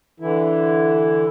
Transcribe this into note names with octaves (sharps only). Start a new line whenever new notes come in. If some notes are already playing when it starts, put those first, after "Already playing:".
D3 E3 E4